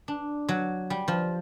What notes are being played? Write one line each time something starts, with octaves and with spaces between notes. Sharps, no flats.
D4
F#3
G3
F3